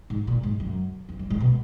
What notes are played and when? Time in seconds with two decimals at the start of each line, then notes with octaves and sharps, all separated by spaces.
0.10 G#2
0.27 A#2
0.43 G#2
0.60 F#2
1.09 E2
1.19 F#2
1.30 G#2
1.40 B2